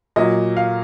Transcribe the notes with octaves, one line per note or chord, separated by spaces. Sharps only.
A#2 F#3 D#5
F5